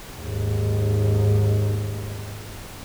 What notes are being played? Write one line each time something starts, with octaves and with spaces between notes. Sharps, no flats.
D#2 G#2